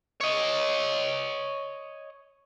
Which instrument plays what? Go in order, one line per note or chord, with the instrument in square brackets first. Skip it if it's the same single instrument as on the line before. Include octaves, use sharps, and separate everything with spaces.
[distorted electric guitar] C#5 D#5